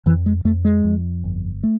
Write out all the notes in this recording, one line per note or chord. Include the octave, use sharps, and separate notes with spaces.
F2 E3
G#3
F2 A3
G#3
F2
G1
A3